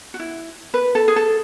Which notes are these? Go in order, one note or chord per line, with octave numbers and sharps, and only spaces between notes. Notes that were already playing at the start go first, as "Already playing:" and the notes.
F#4
E4
B4
A4
G#4
A4